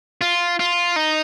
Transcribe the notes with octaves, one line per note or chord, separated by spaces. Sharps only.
F4
F4
D#4